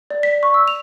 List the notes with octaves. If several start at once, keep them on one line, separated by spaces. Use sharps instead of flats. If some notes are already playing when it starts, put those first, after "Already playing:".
D5
B6
C#6
E6
F7